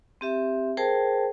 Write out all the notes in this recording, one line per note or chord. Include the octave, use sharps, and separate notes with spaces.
C4 G4 E5
G#4 A#4 C5 G5 A5